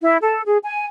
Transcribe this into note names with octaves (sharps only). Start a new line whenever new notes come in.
E4
A4
G#4
G#5